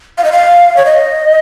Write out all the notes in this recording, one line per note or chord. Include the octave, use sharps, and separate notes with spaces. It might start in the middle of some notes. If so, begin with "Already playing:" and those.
F5
D#5
F5
C#5
D#5